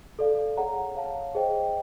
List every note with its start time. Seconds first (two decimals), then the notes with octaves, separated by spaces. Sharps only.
0.19 A4 D5 F5
0.57 G#4 C#5 F#5 A#5
0.95 C#5 F5 A5
1.35 G#4 C5 D#5 G5